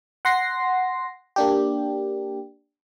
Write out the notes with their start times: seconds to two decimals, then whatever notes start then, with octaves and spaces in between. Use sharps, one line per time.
0.25 F#5 C6 A#6 C7
1.36 A#3 D4 G4